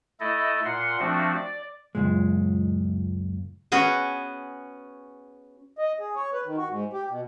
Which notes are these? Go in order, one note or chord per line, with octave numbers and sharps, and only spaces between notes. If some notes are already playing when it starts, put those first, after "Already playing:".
A3 E4 A4 D#5
A#2 F#5 C6
F3 A3 C4 D4 F#4
D5
C#2 F#2 A#2 G#3
B3 C#4 F#4 G#4
D#5
G#4
C#5
B4
D#3
F#4
G#2
G4
B2